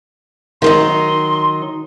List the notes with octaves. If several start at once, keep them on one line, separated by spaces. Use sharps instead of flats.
D#3 F#3 D#4 C6